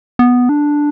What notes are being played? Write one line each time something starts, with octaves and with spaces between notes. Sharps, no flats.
B3
D4